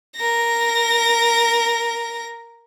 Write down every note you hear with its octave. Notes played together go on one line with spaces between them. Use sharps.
A#4 A#6